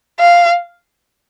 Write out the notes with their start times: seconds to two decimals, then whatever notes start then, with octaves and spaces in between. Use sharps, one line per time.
0.20 F5